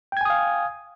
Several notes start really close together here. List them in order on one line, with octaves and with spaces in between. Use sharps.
G5 G#6 G#5 D#6 F5